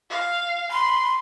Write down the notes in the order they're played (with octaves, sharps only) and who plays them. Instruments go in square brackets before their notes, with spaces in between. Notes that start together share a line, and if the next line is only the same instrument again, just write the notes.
[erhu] F5
[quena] B5 [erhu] C6